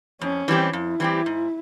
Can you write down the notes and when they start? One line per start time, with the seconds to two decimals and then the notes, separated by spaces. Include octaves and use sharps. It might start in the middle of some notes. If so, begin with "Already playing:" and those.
0.21 F2 C#4
0.48 E3 G3 C4 G4
0.73 F2 E4
1.00 E3 G3 C4 G4
1.26 G#2